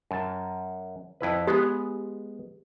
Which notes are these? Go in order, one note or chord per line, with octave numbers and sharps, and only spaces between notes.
F#2 A5
F2 E4 B4
G#3 B3 G4